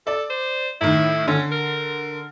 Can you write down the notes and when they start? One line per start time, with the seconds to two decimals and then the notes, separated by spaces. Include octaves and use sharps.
0.07 A4 D5
0.30 C5
0.81 A2 D#3 E4
1.28 D3 C#4
1.52 A#4